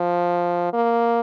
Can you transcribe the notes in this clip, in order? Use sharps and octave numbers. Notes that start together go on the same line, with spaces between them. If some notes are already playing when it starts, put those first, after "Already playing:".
Already playing: F3
A#3